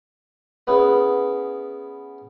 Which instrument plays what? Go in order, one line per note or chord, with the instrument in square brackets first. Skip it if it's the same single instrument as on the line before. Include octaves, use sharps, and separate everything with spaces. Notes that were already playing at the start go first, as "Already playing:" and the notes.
[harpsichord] B3 C#4 E4 G#4 B4